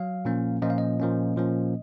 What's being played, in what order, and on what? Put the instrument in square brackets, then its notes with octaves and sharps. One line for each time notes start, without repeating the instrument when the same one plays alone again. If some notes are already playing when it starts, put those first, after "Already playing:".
Already playing: [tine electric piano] F#3 F5
A#2 F3 A#3 C#4
A#2 F3 A#3 C#4 D#5
F5
D#5
A#2 F3 A#3 C#4
A#2 F3 A#3 C#4